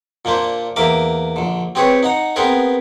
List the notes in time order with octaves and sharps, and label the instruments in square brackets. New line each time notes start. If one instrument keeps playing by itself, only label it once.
[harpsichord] A#2 A#3 D4 C5
E2 A#3 A#4 E5 D6
A#1 D3
C4 G4 G#4 B4 C#5
D#4 F#5 A#5
B3 C4 G#4 A#4 B4